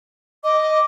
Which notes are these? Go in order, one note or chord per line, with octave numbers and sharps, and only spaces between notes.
D#5 D6